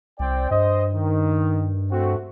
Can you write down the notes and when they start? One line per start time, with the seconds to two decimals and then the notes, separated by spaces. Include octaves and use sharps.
0.20 C2 C4 D5 G5
0.51 G2 C5 D#5
0.94 D#3
1.91 A3 C4 F#4